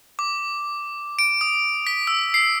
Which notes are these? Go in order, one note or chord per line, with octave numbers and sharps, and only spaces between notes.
D6
D7
D#6
B6
E6
C7